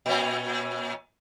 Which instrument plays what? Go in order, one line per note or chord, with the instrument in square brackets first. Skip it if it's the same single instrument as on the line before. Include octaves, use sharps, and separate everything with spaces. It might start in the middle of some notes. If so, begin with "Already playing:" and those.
[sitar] A#2 C#4